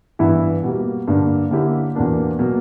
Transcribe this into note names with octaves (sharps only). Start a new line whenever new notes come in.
G2 E3 B3 E4
B2 G3 A#3
G2 D3 A#3 D4
D3 A#3 C#4 E4 G4
E2 B2 A#3 D4 A#4
B2 F#3 A#3